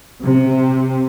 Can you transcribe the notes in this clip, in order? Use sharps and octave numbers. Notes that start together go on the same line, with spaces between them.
C3